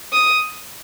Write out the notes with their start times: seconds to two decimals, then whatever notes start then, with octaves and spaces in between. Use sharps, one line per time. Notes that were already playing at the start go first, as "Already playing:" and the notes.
0.13 D#6